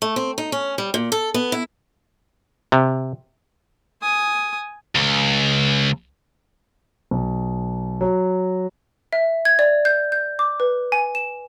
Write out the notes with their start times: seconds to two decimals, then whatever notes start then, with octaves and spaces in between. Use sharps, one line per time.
0.02 A3
0.16 C4
0.38 D#4
0.52 C#4
0.78 G3
0.94 A#2
1.12 A4
1.34 B3
1.52 E4
2.72 C3
4.01 G#5 D#6
4.95 C#2
7.11 B1
8.01 F#3
9.13 E5
9.45 G#6
9.59 D5
9.85 G6
10.12 G6
10.39 D6
10.60 B4
10.92 G#5
11.15 E7